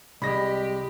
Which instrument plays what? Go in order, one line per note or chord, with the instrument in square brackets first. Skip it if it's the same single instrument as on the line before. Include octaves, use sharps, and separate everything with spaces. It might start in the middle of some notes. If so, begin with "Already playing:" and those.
[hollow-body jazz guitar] C2 [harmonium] G#3 D#5 [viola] G4 [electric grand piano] B5 A#6